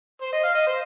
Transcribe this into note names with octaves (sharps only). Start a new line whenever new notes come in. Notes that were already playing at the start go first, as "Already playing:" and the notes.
C5
D#5
F5
D#5
C5